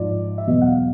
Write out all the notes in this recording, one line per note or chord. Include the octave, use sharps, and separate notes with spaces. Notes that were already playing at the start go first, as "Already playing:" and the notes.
Already playing: G#2 F3 D5
E5
E2 B2 F#3 D#5
F#5
F5